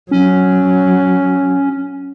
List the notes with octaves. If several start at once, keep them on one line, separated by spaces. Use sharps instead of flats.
F#3 C#4